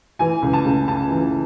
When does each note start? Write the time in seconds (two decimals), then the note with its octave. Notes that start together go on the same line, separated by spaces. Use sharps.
0.19 E3 G#5
0.42 C#2
0.53 A5
0.65 C#2
0.88 C#3 A5
1.11 E3